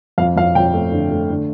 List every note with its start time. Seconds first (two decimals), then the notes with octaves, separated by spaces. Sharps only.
0.18 F2 F5
0.36 F2 F5
0.55 F2 G5
0.73 A3
0.92 D3
1.11 A3
1.30 D3